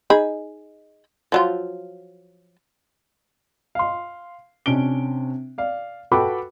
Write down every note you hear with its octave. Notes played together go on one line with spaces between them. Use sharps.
D#4 G#4 B5
F3 F#3 F4
F5 C6
C3 C#4 D4 D7 G7
D5 F5
F#4 A4 B4 G5 B5 D6